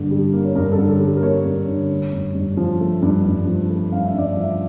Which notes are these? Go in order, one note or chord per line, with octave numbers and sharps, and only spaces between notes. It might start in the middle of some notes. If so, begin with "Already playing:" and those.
Already playing: G2 D3 A#3
G3
A#3
C#5
G2 A#4
A4
D3
A4
G3
A#4
A#3 C#5
G2
D3
A3
G2
G2
F3
A3
G2
G2
F3
A3
G2 F5
E5
G2 D5
F3 E5